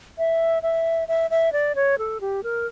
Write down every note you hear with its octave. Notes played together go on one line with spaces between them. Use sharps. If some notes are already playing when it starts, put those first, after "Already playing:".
E5
E5
E5
E5
D5
C#5
A4
G4
A#4